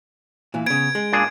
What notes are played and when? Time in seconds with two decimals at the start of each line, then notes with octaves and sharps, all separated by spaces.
0.54 A#2 E3
0.66 C#3 B3 G#6 D7
0.95 G#3
1.13 A#2 D4 G#4